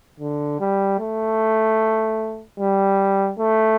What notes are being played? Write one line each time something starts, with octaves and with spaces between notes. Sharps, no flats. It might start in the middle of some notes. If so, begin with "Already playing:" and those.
D3
G3
A3
G3
A3